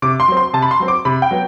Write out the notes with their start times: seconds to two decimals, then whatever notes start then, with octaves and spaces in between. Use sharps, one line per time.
0.02 C3 D6
0.20 C6
0.28 F#3 C4
0.37 C6
0.53 C3 A5
0.62 B5
0.71 C6
0.80 F#3 C4
0.88 D6
1.05 C3 B5
1.22 G5
1.31 F#3 B3